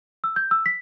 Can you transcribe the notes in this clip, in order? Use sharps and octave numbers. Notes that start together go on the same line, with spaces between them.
E6
G6
E6
B6